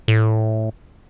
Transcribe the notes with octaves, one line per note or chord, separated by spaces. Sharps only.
A2